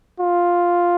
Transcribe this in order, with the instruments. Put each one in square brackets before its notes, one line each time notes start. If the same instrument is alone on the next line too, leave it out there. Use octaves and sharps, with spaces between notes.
[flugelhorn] F4